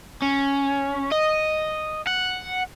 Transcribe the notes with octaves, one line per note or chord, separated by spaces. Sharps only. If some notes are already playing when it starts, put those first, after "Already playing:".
C#4
D#5
F#5